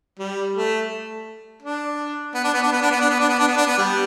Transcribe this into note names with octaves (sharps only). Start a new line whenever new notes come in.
G3
A3
D4
B3
D4
B3
D4
B3
D4
B3
D4
B3
D4
B3
D4
B3
D4
B3
G3